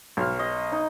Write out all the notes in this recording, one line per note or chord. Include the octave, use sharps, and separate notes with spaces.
B1 F6
D#5
D#4